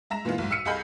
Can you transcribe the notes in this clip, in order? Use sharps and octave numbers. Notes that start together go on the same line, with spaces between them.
G#3 E5 A#5 A#6 E7
A#2 E3 G#3 B3 F4
B1 G#2
E6 F6 B6 C#7 D#7
C2 G#4 D#5 F5 B5 G6